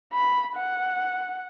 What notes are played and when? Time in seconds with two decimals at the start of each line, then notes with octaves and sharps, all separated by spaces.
0.13 B5
0.56 F#5